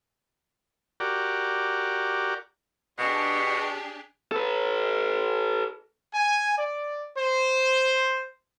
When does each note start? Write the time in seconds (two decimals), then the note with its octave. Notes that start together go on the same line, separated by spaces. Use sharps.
1.00 F#4 G4 A#4 D5
2.99 B2 D4 G4 G#4
4.32 A4 B4
6.14 G#5
6.58 D5
7.16 C5